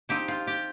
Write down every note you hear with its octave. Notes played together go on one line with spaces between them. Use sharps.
F3 C4 D#4 G4
F4
G4